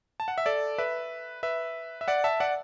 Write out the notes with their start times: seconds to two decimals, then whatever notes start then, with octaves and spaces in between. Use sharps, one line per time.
0.20 A5
0.28 F#5
0.38 E5
0.46 A4 D5
0.78 B4 E5
1.43 B4 E5
2.01 E5
2.08 D5 F#5
2.24 E5 A5
2.40 D5 F#5